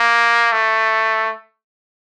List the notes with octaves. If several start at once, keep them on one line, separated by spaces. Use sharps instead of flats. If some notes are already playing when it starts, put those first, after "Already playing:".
Already playing: A#3
A3